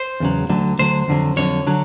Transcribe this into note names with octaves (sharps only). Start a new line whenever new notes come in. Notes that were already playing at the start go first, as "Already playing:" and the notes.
Already playing: C5
E2 C#3 F#3
D2 D3 F#3
D2 D3 F#3 C5
F2 D3 F#3
F2 D3 F#3 C#5
D3 F#3